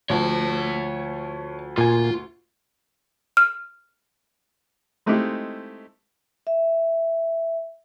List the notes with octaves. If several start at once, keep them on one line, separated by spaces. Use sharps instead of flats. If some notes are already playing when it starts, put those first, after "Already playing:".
D2 F3 C#5 A5
A#2 F4 G#5
F6
G#3 A3 C4 D#4 E4 G4
E5